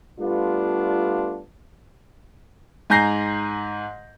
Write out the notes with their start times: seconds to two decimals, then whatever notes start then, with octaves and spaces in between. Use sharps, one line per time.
0.20 G3 A3 B3 D4 F4
2.90 G#2 G#5 A#5 G6 A#6 C7